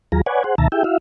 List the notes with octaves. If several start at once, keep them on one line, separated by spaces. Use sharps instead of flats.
D#2 F#3 F4 G#4 A#5
B4 C#5 D5 F#5 G#5
G#4 C5 F#5
D2 B2 D#3 E5 A5 A#5
E4 G4 G#4 E5 G5
E4 F#4 E5 F5